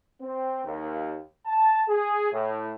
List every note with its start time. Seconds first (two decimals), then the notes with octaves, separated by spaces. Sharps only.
0.21 C4
0.65 D#2
1.46 A5
1.89 G#4
2.32 A2